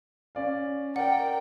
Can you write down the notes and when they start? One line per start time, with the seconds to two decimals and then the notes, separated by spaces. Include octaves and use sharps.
0.35 C#4 D5 F5
0.96 A#4 D5 F#5 G5